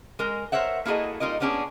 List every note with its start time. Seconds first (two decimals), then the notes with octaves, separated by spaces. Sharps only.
0.19 G#3 A#4
0.52 A#4 C5 C#5 E5 F#5
0.85 A#3 E4 F#4 G#4 A4 D#5
1.20 G3 D#4 F4 A#4 D#5
1.40 A#3 B3 C#4 D4 G#4